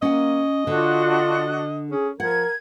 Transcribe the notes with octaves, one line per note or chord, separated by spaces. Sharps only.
A#3 C#4 D#5 F#5
D3 D4 F4 F#4 F#6
C#4 G#4
F3 A#4 F#5 G#6